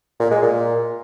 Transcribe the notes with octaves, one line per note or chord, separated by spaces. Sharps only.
A#2
G#3
A#2